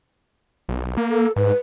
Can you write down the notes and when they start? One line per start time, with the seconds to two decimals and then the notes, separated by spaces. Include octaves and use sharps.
0.69 B1
0.97 A#3
1.10 A4
1.36 G#2 B4